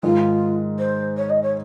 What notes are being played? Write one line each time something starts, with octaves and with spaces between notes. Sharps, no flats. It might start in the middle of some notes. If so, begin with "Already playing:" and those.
G#2 D#3 G#3 F4
C5
C#5
D#5
C#5